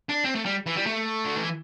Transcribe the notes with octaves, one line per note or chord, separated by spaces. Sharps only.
D4
C4
A3
G3
E3
G3
A3
D3
E3